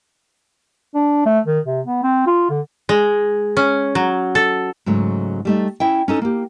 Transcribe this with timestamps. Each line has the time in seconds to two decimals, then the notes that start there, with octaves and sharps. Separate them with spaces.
0.95 D4
1.26 A3
1.46 D#3
1.65 C3
1.87 B3
2.03 C4
2.26 F4
2.50 D3
2.89 G#3
3.57 C#4
3.95 F#3
4.35 A4
4.86 G#2 C#3 F#3 A3
5.45 G3 A3 D#4
5.80 C#4 E4 E5 G5
6.08 C#4 D#4 A4
6.22 A#3 G4